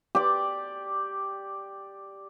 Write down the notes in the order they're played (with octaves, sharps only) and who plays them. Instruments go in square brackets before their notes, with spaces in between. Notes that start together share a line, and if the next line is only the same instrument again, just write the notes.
[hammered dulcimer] G4 D5